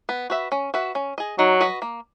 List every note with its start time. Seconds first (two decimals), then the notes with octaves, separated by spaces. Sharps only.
0.09 B3
0.30 F#4 B4 E5
0.52 C#4
0.74 F#4 B4 E5
0.95 C#4
1.18 G#4 D#5
1.38 F#3 D#4
1.60 F#4 B4 D#5
1.82 A#3